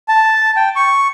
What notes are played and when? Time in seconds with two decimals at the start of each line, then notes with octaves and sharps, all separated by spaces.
0.08 A5
0.56 G5
0.76 C#6